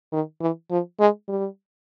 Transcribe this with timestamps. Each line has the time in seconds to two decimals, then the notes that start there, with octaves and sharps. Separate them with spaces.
0.13 D#3
0.41 E3
0.71 F3
1.00 G#3
1.28 G3